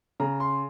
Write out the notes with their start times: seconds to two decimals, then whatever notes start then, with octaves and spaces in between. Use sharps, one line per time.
0.20 C#3 A#5
0.40 C6